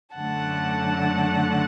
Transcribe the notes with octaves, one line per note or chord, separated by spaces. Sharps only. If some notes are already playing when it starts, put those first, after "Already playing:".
F#2 D3 A3 F#5 A5